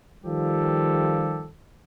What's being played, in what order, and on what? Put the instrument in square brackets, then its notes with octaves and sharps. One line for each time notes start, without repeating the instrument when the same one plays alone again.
[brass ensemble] D#3 F3 G3 F4 G4 A4